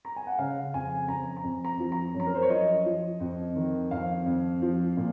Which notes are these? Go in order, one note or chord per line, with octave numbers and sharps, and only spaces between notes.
A#5
G#5
F#5
C#3 F5
F2 G#5
F2 A#5
A#5
F2
A#5
F3
A#5
F#2
A#5
A#4
C5
C#5
F3 D#5
F3
F2
D#3
F2 F5
F2
F3
A#2